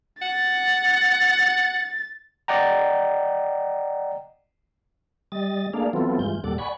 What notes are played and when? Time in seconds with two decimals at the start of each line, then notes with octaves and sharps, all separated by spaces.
0.22 F#5 A6
2.48 D5 D#5 F#5 G5 A#5
5.32 G3 D#5 A6
5.73 A3 A#3 D4 G#4 D5 F5
5.93 E3 F#3 B3 C4 F4 A4
6.19 G2 E3 G#3 F4 G6
6.44 D#2 A#2 G3 A4 F#5 D6
6.58 D5 F#5 G#5 B5 C#6